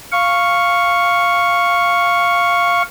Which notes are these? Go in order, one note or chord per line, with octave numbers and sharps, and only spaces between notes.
F5 C#6